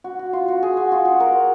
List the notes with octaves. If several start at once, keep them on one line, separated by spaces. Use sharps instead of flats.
F#4
F#4
F4
F#4
G#4
F#4
F4
F#4
A#4